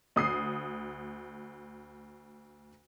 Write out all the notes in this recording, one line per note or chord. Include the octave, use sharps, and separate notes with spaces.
D2 D#6 C7